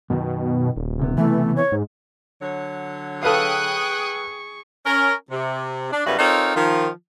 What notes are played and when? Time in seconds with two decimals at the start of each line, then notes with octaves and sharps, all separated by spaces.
0.10 F#2 B2 D#3
0.77 D#1
0.99 C#2 C3 B3
1.18 E3 A3
1.56 C#5
1.72 G#2
2.42 D3 F#3 C#5
3.23 G#4 A4 B4 F5 G5 C#6 D#6 F#6
4.86 C#4 A#4
5.30 C3
5.92 D4
6.06 F#2 C#3 G3 B3 E4 F#4
6.19 C4 D#4 F4 A4 A#4 C#5
6.55 D#3 F3 F4